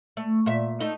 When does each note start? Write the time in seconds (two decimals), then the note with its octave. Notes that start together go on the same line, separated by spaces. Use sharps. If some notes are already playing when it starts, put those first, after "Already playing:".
0.17 A3
0.46 A#2 E5
0.80 A3 D#4